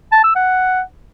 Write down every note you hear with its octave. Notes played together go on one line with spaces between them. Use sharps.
A5
E6
F#5